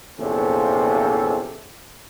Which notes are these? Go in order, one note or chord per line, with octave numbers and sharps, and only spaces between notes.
A#1 E2 C3 C#4 F4 A4